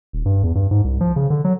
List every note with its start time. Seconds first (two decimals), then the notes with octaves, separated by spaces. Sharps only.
0.13 D#1
0.26 G2
0.43 E2
0.55 G2
0.71 G#2
0.84 C2
1.01 F3
1.16 C#3
1.30 D3
1.44 F#3